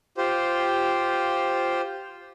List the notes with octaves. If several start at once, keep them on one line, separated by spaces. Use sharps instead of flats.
F4 G4 C5